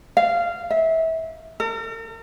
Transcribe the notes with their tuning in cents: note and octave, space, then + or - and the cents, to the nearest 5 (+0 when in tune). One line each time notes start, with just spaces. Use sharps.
F5 -15
E5 -30
A#4 -45